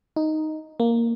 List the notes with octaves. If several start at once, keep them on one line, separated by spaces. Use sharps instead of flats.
D#4
A#3